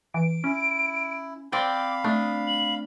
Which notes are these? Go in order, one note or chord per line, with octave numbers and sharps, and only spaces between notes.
E3 D7
C#4 E4
C4 D5 F5 G5 B5 D6
A3 D4 D#6
F#7